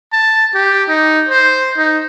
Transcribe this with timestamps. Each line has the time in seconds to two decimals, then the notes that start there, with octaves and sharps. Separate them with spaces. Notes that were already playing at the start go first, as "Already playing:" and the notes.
0.13 A5
0.55 G4
0.89 D#4
1.29 C5
1.77 D#4